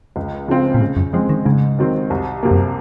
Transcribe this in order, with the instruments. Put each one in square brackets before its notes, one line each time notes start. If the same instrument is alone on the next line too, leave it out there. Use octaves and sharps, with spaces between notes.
[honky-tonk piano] C#2
C#3 F3 C4 F4
[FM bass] A#2
[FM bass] G#2 [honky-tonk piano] C#3
[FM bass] F#2
[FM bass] F3 [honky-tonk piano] G#3 C4
[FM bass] D#3
[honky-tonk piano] G#2 [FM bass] C#3
[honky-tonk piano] D#3 F#3 C4
C2
C3 F#3 A#3
[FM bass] F#2